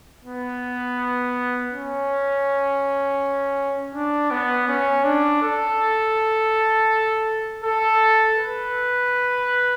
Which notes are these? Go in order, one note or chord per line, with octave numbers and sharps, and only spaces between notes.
B3
C#4
D4
B3
C#4
D4
A4
A4
B4